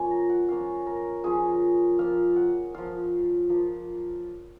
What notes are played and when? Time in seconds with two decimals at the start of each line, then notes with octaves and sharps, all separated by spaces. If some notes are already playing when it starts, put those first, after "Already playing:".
Already playing: F3 A#3 C#4 F4 G#5
0.11 A#5
0.29 F#5
0.48 F3 A#3 C#4 F4 F5
0.87 A#4
1.24 F3 A#3 C#4 F4 G#4
1.99 F3 A#3 F4 F5
2.36 F#5
2.74 F3 A#3 F4 F5
3.50 F3 A#3 F4